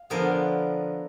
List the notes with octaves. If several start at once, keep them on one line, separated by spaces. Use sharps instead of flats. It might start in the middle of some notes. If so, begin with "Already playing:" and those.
Already playing: F5
D3 F3 B3 A#4